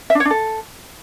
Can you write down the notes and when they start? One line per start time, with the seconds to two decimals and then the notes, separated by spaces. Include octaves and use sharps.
0.10 E5
0.15 D4
0.20 C#5
0.25 D4
0.30 A4